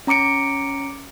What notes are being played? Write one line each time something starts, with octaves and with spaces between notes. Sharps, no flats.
C#4 A#5 D6 C#7 D7